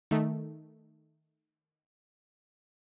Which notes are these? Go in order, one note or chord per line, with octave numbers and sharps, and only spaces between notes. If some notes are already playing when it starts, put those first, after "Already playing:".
D#3 A3